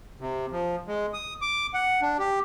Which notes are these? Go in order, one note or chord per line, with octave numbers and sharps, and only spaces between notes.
C3
F3
G#3
D#6
D6
F#5
D4
G4